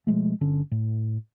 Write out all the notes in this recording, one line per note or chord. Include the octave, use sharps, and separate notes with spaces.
B2 F3 G#3 A3
G1 D3 C#4
A2